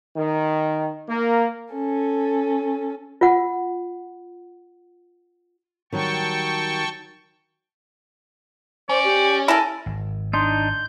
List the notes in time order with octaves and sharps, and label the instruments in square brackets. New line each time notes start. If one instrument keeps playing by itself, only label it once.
[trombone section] D#3
A#3
[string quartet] C#4 A4
[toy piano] F4 F#5
[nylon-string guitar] D#3 F#3 G3 [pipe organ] G5 A5 C#6
[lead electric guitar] C#4 [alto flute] C5 [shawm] D5
[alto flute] G4
[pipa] E4 A4 [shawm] A#4 [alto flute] G#5
[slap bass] G#1
[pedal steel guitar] D4 D#4 [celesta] C6 [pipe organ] G6